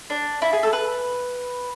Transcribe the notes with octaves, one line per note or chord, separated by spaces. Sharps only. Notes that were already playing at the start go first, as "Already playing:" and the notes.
D4
E4
G#4
A4
B4